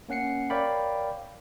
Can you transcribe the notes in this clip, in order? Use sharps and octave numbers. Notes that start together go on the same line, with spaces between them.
A#3 C#4 F#5 C7 C#7
A#4 C#5 D5 F5 G5 B5